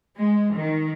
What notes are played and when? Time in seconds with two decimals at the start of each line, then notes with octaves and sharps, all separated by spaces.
0.17 G#3
0.55 D#3